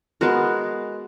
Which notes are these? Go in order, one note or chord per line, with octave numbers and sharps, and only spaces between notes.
G#3 B3 F#4 A#4